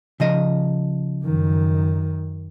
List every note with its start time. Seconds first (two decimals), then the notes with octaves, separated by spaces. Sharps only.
0.20 C#3 F3 D#5
1.24 F#2 D#3